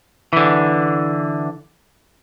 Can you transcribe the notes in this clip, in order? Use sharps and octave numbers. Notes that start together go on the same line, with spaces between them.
D3 E3